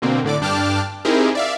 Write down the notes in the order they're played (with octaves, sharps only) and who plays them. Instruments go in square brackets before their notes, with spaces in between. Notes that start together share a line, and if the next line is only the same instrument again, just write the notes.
[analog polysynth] B2 D3 A#3 C4
A2 D3 D5 D6
G2 D4 G5 A5 D6 F6
C4 D#4 E4 G4 G#4 A#4
D5 E5 F5